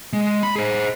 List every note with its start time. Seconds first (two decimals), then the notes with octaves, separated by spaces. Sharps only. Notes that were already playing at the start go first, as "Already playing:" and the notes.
0.13 G#3
0.43 B5
0.56 G#4 C5